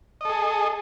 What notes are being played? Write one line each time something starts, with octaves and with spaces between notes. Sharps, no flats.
G#4 A4 D#5